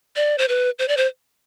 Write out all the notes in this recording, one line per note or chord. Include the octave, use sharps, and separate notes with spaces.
D5
C5
B4
C5
D5
C5